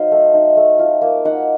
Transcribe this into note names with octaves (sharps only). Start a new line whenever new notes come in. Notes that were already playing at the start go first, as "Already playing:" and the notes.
Already playing: F#3 D#4 C5 D#5 F5
A3
D#4
A3
F4
A#3
D#4 F#5